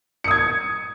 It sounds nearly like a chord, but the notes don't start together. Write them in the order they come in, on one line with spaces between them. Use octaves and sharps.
C#7 D#6 G#6